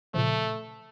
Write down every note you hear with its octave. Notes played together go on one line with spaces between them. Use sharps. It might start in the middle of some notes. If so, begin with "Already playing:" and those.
A#2 C#3 F3 A3